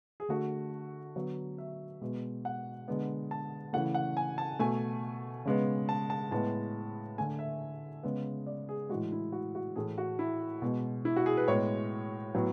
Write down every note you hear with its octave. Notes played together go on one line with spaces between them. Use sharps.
G#4
D3 A3 F#4
D3 F#3 B3
E5
B2 G#3 B3
F#5
D3 G#3 B3
A5
C#3 E3 A3 F#5
F#5
G#5
A5
B2 A3 G#5
C#3 G#3 B3
A5
A5
A2 G#3 B3 A5
D3 A3 G#5
E5
C#3 G#3 B3
D5
G#4
A2 E3 G#3 F#4
E4
F#4
F#4
A2 E3 A3 G#4
F#4
E4
B2 G#3 B3
E4
F#4
G#4
B4
A2 G#3 B3 C#5
A2 F#3 B3